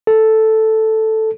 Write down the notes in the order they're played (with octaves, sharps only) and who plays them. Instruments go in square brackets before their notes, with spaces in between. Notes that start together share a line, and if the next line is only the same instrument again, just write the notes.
[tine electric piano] A4